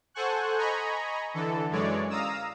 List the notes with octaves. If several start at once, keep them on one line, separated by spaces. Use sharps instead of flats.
A4 C5 F#5 G#5 C#6 F#6
D#5 G#5 A#5 B5 C#6
D3 E3 A4
F#2 E3 G#3 C#5 D5
F5 A#5 D#6 E6